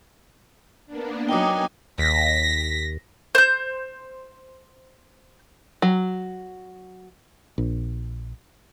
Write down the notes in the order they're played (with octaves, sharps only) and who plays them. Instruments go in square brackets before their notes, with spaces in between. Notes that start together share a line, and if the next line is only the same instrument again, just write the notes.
[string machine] A#3 B3 D4
[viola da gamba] F#3 D#4 [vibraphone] G5 D6 D#6 [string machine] G#5
[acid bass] D#2 [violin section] A#6 B6
[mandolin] C5 G6
[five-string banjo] F#3
[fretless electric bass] A#1